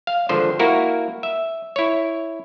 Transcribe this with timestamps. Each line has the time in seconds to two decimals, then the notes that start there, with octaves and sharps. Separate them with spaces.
0.07 F5
0.29 G#1 D3 F3 C5
0.59 A#3 E4 F#4 A#4
1.23 E5
1.76 E4 C#5